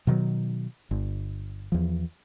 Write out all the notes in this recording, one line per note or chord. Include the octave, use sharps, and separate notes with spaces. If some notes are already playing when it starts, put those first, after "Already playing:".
B2 D#3 F3 F#3
G1
E2 F3